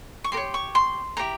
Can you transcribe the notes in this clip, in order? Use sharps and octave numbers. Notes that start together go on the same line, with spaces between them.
C#6
G4 A#4 C6
C#5
C#6
C6
E4 G4 C5 A#5